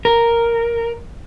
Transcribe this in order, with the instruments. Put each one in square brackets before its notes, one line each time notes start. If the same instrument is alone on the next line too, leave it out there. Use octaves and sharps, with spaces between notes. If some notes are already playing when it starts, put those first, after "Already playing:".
[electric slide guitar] A#4